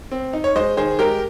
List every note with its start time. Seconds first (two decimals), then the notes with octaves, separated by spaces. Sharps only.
0.11 C4
0.33 D#4
0.44 C#5
0.56 G#3 C5 D#5
0.77 D#3 G#4 C5
0.99 G#3 G4 A#4